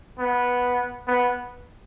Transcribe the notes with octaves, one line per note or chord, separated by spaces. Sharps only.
B3
B3